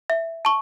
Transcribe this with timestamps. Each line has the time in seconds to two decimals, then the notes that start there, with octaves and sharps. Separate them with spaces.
0.10 E5
0.45 A5 C#6